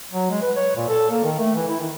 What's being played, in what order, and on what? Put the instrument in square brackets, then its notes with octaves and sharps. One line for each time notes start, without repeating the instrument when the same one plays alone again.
[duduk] F#3
G#3
B4
C#5
A#2
A4
A#3
D#3
A3
E3
E4
D#3